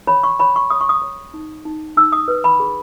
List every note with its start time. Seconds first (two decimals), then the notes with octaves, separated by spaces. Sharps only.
0.07 C#5 B5
0.23 C#6
0.40 C#5 B5
0.56 C#6
0.70 C#5 D#6
0.81 C#6
0.89 D#6
1.02 C#5
1.34 D#4
1.65 D#4
1.97 D#4 E6
2.12 D#6
2.28 B4
2.44 B5
2.60 G#4